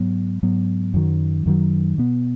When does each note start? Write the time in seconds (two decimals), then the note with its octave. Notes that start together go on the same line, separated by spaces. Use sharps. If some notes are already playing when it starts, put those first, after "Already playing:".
Already playing: G#2 F#3 B3
0.43 G#2 F#3 B3
0.94 F#2 D#3 F#3
1.46 F#2 D#3 F#3
1.98 B2 B3